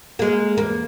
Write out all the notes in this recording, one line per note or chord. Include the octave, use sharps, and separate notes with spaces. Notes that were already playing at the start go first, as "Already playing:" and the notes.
G#3 A#3
E2 A#3